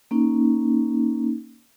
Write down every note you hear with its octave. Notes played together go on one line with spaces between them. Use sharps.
A#3 C#4 D#4